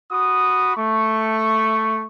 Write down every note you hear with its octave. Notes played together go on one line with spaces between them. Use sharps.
F#4 B5 D#6
A3 C#6